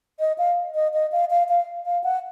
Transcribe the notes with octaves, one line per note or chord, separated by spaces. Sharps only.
D#5
F5
D#5
D#5
F5
F5
F5
F5
F#5